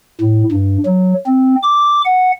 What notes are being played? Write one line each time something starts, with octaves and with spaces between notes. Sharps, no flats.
A2
G2
F#3
C4
D6
F#5